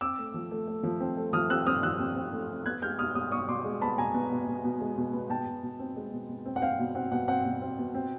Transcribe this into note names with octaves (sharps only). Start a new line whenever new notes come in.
C4 D6 E6
A3
F3
A3
A3
F3
C4
A3
F3 D#6 F6
C4 E6 F#6
C4 D#6 F6
F3 E6 F#6
C4
C4
A3
C4
B3 F#6 G#6
G#3 F6 G6
B2 D#6 F6
B2 D#6 F6
B3 C#6 D#6
B2 C6 D6
G#3
B3 A5 B5
B2 G#5 A#5
B3
B2
B2
B2
G#3
B2
B3
B2 G5 A5
B2
B2
C4
G#3
B2
B2
C4
F#5
C4 F5 G5
B2
C4 F#5
B2 F#5
C4 F#5
B2
C4
B2
C4